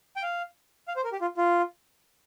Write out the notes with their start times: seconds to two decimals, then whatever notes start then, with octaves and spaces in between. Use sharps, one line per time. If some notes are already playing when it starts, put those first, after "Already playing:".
0.16 G5
0.23 F5
0.88 F5
0.96 C5
1.04 A#4
1.12 G4
1.21 F4
1.37 F4